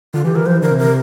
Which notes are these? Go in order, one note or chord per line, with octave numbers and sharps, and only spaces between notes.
D3 F4
E3 G4
E3 A#4
F3 C5
E3
D3 A#4
C3
A#4